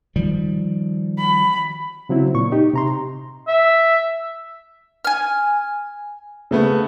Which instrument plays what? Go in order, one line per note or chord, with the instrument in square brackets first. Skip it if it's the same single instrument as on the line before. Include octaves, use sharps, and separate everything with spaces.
[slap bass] D#3 F3 G3
[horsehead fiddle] B5
[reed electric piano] C#3 F#3 C4 E4
A#2 C#6
D#4 G4
C3 A#5 C6
[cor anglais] E5
[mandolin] G#5 F6
[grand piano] C#3 A3 B3